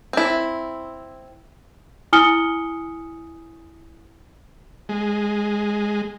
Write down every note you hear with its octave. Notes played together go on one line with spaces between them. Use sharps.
C4 E4
E4 G#5 D#6 F6 C#7 G7
G#3